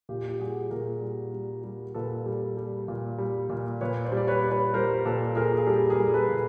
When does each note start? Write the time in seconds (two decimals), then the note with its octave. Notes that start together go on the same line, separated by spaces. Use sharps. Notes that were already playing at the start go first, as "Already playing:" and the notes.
0.09 A#2 F4 G4
0.29 G4
0.39 G3 F#4 G#4
0.71 A#2 G#4 A#4
1.01 G3
1.34 G3
1.64 G3
1.95 A#2 A4 B4
2.26 G3
2.57 G3
2.88 A#2
3.18 G3
3.49 A#2
3.81 A#2 B4 C#5
4.05 C5 D5
4.12 G3
4.17 D5
4.27 B4 C#5
4.43 G3
4.51 B4 C#5
4.74 G3 A#4 C5
5.05 A#2 A4 B4
5.36 A#2 G#4 A#4
5.57 G#4
5.67 G3 G4 A4
5.90 G#4 A#4
5.98 G3
6.14 A4 B4
6.29 A#2